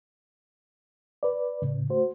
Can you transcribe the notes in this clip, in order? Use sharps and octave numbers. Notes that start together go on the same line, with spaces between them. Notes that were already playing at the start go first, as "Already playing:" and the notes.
B4 D5
A2 C#3
A3 F#4 C5